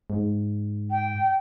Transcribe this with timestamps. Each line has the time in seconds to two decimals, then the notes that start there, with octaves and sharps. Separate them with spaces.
0.10 G#2
0.91 G5